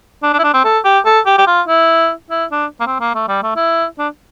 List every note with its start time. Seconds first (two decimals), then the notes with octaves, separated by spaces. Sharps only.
0.23 D4
0.33 D4
0.39 E4
0.44 D4
0.54 C4
0.64 A4
0.85 G4
1.05 A4
1.26 G4
1.38 G4
1.47 F4
1.68 E4
2.30 E4
2.51 D4
2.80 A#3
2.87 C4
3.00 A#3
3.15 A3
3.28 G3
3.43 A3
3.56 E4
3.98 D4